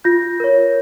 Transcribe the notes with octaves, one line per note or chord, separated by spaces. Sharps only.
F4 G6 A#6
A#4 C#5